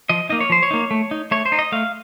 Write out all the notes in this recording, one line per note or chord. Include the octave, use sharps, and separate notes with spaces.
F3 D#5
A#3 D#4 D#5
C#5
F3 C5
C#5
A#3 D#4
A3
D#4
A3 C#5
C5
D#4
D#5
A3 F5